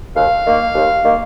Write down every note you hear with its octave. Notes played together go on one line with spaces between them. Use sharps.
D#2 F5
D#3 A#3
D#2
D#3 A#3